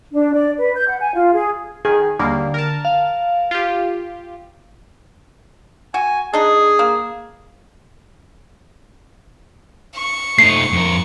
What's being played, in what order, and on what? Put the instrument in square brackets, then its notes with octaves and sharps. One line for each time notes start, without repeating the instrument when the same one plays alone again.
[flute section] D4
D5
B4
G6
F#5
G#5
F4
G#4
[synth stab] D#3 [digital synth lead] G#4
[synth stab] D#2 G3 A#3 [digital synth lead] D3
[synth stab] A#4 A5
[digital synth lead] F5
[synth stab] F4 G4
[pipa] F#4 [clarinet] G#5
[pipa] D4 D#4 D#5 [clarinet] G#4
[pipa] A#3
[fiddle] C#6
[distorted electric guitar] A3 D#4 [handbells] C7
[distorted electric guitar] F2 A#4